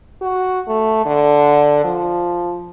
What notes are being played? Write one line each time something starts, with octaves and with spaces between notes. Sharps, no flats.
F#4
A3
D3
F3